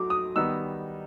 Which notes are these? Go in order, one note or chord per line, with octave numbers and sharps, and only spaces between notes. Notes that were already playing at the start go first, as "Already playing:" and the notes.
Already playing: F#3 A3 D6
D#6
D#3 G3 B3 D#4 E6